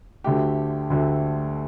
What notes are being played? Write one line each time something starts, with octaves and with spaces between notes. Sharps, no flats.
D2 D3 A3 G4
D2 D3 A3